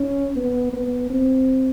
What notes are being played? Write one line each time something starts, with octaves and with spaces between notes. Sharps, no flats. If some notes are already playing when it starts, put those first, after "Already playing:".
Already playing: C#4
B3
B3
C4